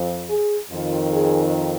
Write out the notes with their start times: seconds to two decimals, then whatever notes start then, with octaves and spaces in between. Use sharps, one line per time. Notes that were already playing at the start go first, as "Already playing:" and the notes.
Already playing: F2 F3
0.30 G#4
0.70 F2 D#3 F4
1.12 G#4